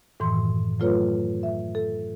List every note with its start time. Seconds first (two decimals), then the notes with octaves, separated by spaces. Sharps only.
0.20 F#2 A2 D#3 E3 C6
0.80 F#3 A3 F4 A4 B4 C#5
1.43 E5
1.75 A4